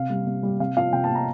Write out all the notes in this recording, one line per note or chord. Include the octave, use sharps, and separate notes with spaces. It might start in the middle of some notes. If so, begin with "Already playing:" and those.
Already playing: C3 F5
G3
C3
G3
C3 F5
F3 F5
C3 G5
A5
F3
A#5